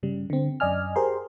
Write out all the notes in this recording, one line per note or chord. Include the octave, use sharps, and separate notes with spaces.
G2 C#3 G3
D3 C4
F#2 D5 D#5 G#5 F6
G4 G#4 A#4 C5 C6